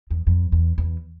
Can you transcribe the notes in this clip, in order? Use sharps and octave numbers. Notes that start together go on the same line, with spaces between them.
E2
F2
E2
E2